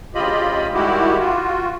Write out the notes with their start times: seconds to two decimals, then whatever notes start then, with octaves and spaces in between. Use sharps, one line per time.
0.15 D2 C#3 F4 G4 D#5 B5
0.74 D#3 G3 G#3 E4 F#4 G4
1.19 F4 F#4